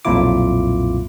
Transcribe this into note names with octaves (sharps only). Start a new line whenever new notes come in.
B1 F2 A#2 E4 F4 D6